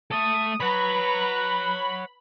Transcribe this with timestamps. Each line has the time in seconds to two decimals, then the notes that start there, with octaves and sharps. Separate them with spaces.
0.11 A3 A4 D#6
0.60 B4 C#5 F#5 A#5 B5